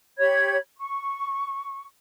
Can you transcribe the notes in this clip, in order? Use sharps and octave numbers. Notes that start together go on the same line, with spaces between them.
G4 C#5 B5 G#6
C#6